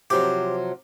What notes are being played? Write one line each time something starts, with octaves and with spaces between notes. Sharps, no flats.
C3 F3 F#3 G4